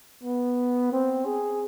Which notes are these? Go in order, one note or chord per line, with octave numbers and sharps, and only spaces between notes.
B3
C4
G#4